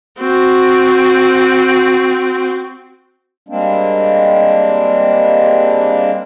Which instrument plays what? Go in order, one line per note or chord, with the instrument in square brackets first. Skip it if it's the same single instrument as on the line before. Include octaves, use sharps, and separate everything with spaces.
[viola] C4 F#4
[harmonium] G3 G#3 A#3 C4 D4